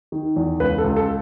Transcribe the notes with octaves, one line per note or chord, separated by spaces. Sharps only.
D#3
E2
C#2 B4
A4
C#2
A4